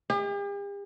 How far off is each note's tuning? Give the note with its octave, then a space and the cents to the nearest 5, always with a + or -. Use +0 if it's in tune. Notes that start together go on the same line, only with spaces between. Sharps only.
G4 +45